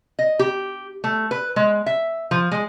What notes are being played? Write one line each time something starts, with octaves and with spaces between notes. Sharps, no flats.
D#5
G4
A3
B4
G#3
E5
F3
G#3